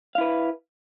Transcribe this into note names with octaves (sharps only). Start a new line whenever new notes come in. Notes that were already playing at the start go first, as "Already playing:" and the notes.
E4 B4 F5